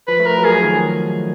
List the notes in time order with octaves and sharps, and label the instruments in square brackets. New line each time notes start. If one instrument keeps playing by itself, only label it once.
[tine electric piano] F3 [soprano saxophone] B4
[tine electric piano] A3
[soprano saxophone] A#4
[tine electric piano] F#3
[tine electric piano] F3 [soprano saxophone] G#4
[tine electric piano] D#3